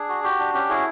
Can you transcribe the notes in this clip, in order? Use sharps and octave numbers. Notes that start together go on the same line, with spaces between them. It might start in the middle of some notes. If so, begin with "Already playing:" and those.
Already playing: D4 G#4
F#4
F#4 G4
D4
C#4 G4
E4 F#4 G#4